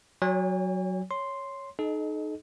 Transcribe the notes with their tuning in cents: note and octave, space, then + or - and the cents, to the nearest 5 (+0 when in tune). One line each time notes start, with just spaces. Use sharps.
F#3 +0 C#5 +40 G#5 -40
C#5 +0 C6 +0
D#4 -15 A4 -45 D#5 +0